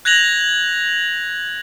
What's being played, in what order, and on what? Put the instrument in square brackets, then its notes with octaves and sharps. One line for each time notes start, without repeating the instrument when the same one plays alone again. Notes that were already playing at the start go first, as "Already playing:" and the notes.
[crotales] F#6 G#6 A#6 F7 F#7